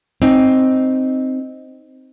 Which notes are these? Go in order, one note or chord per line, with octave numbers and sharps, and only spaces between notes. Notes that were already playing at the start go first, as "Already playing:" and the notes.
C4 D#4